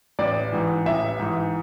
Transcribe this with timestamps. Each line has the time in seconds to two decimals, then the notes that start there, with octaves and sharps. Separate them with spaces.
0.19 A1 D5
0.52 G#2 E3
0.86 A1 E5
1.19 G#2 E3